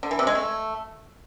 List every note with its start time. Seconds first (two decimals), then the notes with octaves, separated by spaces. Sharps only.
0.03 D3
0.11 E3
0.19 C3
0.27 G#3
0.35 A3